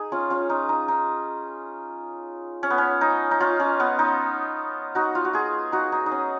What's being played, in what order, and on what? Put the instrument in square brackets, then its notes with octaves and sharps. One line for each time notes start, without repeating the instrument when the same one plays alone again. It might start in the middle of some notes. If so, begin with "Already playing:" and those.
Already playing: [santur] D#4 G#4
C#4 F4
C#4 F4
D#4
D#4
D#4
C#4
B3
C#4
D#4
D#4
C#4 F4
C#4
B3
D#4
D#4 F#4
F4
F#4
F4 G#4
D#4 F#4
D#4
D#4
C#4